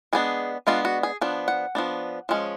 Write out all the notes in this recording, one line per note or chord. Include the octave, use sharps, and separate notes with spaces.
G#3 B3 D4 G#4
G#3 B3 D4 F4
F#4
G#4
F3 B3 D4
F#5
F3 B3 D4
F3 G#3 C#4